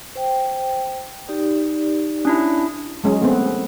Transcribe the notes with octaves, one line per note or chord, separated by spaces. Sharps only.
C5 G5
D#4 G4 D5
C#4 D4 E4
F#3 G#3 C#4
G#3 A3 B3 C4